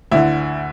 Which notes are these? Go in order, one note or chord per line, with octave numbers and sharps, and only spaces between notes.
D2 D3 E4